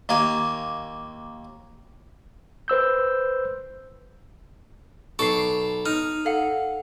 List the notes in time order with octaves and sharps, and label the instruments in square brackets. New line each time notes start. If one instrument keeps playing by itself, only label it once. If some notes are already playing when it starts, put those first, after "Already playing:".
[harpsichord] D#2 A#3 G#5
[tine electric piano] B4 C5 E6 G6
[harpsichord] B1 A4 D6 [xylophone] C#6 C7
[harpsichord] D#4 [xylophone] F6
[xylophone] A4 F5 F#5